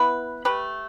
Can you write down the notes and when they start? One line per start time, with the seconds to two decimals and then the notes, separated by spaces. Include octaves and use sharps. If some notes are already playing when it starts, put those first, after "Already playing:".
Already playing: B3 E4 B4
0.45 A3 G4 B4